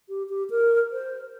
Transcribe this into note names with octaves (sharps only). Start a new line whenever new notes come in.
G4
G4
A#4
C5